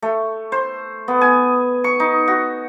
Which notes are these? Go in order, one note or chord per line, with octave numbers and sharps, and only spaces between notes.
A3
C5
B3
G#5
C#6
D#4
F#4